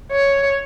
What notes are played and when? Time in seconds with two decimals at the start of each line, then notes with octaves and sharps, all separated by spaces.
0.12 C#5